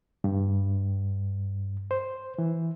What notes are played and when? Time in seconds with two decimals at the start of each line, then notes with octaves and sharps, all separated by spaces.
0.24 G2
1.91 C5
2.38 E3